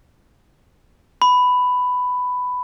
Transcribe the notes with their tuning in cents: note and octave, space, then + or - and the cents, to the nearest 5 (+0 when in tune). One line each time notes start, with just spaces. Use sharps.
B5 +10